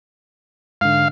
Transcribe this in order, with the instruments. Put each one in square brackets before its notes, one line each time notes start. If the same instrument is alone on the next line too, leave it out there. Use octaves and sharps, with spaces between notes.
[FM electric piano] G#2 D3 [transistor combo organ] F5